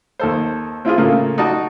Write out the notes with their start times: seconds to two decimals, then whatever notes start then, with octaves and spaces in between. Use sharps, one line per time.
0.19 D#2 A4 C5
0.85 C4 E4 F4 G#4
0.98 A2 C#3 A#3 F4
1.38 D#4 F#4 D5 A5